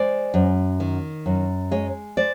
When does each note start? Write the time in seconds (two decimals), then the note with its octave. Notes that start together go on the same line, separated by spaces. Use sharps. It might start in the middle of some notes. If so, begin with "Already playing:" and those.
Already playing: G#3 C5 D5
0.34 F#2
0.80 D#3
1.26 F#2
1.71 G#3 C#5 D#5
2.17 C5 D5